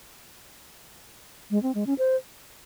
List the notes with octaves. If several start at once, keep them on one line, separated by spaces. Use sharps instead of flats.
G#3
C4
G#3
C#4
C5